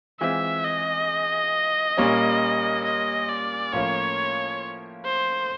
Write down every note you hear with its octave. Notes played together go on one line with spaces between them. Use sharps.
E3 G#3 C4 F4 E5
D#5
A#2 G3 A#3 C#4
D#5
D5
A2 F3 A#3 C#4 F4 C#5
C5